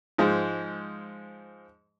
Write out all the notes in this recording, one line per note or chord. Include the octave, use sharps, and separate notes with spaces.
G#2 F3 G#3